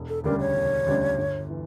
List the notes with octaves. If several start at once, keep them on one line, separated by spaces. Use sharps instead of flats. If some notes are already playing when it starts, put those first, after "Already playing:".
Already playing: E1
A4
D2 C#3 G3 D4 A#4
C#5
E1
D2 C#3 G3 D4
G1
E3